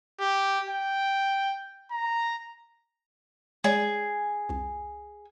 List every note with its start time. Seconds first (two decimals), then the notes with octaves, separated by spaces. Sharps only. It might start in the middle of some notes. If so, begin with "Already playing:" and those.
0.20 G4
0.69 G5
1.91 A#5
3.64 G#3 G#4 C#5 D5
4.49 C2 F2